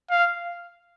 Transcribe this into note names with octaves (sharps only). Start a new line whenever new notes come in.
F5